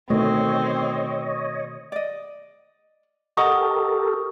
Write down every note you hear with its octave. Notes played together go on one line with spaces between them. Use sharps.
B2 D#3 A3 C4 C#5 D#5
D5 D#5
G4 A4 A#4 D#5 F#5 A#5 C#6 D#6